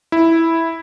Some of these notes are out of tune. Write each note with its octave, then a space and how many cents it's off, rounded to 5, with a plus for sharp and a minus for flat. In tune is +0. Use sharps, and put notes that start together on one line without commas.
E4 -5